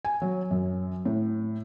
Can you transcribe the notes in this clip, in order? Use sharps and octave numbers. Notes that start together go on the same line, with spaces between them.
G#5
F#3
F#2
A2